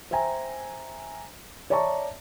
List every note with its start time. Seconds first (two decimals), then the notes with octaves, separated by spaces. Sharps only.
0.11 C5 E5 G5 G#5 A#5
1.70 C#5 D5 E5 A5 A#5 C#6